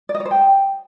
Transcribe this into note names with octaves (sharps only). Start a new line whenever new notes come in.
D5
D#5
C#5
C5
G5